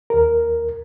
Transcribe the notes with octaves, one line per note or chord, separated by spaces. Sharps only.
D#2 A#4